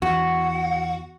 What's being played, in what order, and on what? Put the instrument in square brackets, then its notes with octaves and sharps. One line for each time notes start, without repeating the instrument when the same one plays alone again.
[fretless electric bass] E2 [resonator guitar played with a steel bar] F#4 [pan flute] F#5